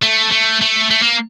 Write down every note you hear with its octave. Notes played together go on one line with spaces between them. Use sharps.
A3
A3
A3
A3
A#3